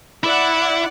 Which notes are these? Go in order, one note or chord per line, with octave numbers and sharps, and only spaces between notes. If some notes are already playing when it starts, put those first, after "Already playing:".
E4 D5 F#5